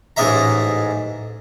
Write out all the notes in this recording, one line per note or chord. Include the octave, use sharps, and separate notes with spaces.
A1 G#2 G#3 D#5 E5 A#5